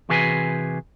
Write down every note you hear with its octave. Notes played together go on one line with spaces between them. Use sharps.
C3 E3 F#4 G#4 B4 G#5